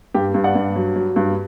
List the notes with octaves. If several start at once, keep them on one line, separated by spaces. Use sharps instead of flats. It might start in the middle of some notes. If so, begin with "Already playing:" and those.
G2 G4
G2
D5 F#5
G2
F#3
F#3
G2